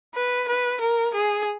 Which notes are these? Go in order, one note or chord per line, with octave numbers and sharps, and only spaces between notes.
B4
B4
A#4
G#4